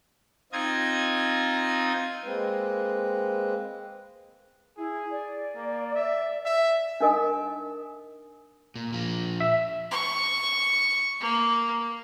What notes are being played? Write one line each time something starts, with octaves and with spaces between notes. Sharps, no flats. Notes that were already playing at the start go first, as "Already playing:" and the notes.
C4 D#4 F4 D#5 G#6
G#3 A#3 C4 B4
E4 G#4
D5
A#3
E5
E5
D4 D#4 A#4 D#5 G#5 D#6
A#2
A#2 F3
E5
C#6
A#3